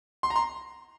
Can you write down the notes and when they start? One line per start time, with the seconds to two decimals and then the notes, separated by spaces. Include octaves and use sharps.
0.23 C6
0.30 A#5
0.36 C6